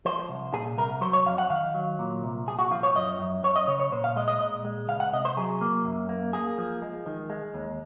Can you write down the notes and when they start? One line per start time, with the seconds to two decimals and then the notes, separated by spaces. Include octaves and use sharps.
0.05 F3 C5
0.29 C2
0.53 A#2 G#4
0.78 C2 A#4
1.01 F#3 C5
1.13 C#5
1.26 F2 F5
1.38 F#5
1.50 D#3 F5
1.75 F#3
1.99 A#2
2.23 C2
2.47 A#2 G#4
2.59 F#4
2.71 F3 F4
2.83 C#5
2.95 F#2 D#5
3.19 F#2
3.43 F#2 C#5
3.56 D#5
3.68 C#3 C#5
3.80 C#5
3.92 A#2 C5
4.04 F5
4.16 G#3 D#5
4.28 D#5
4.40 A#2 D#5
4.65 G#3
4.88 C#2 F5
5.00 F#5
5.13 C3 D#5
5.25 C5
5.37 F#3 G#4
5.61 A#3
5.85 F#2
6.09 A#3
6.33 A#3 G#4
6.58 F3
6.82 G#3
7.06 D#3
7.30 G#3
7.54 D#2